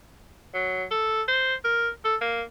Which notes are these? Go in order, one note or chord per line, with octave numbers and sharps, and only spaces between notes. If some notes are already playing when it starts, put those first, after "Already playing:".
F#3
A4
C5
A#4
A4
A#3